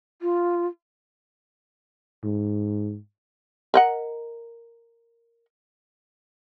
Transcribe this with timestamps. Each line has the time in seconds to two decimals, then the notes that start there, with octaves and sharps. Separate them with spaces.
0.22 F4
2.24 G#2
3.74 A#4 D#5 F#5